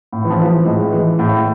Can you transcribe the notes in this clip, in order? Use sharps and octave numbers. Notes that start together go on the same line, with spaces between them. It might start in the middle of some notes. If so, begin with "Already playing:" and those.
A2
E3
F3
E3
F3
A2 G#3
E3
A2